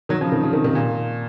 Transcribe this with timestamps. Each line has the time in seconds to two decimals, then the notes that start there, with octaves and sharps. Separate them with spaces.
0.09 D#3 F#3
0.21 C#3 F3
0.32 C3 D#3
0.43 C#3 F3
0.53 C3 D#3
0.64 C3 D#3
0.75 A#2